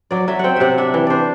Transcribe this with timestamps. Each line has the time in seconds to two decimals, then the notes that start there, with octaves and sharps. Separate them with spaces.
0.11 F#3 D5
0.28 F#3 E5
0.39 C4 F#5 G5
0.56 C3 E5 F#5
0.78 D4 E5
0.94 E3
1.07 D4 C5 D5